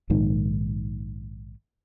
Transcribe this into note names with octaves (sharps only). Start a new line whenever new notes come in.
A#1 G#2 D#3